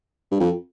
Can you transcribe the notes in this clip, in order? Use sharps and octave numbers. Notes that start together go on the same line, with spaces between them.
G2
F2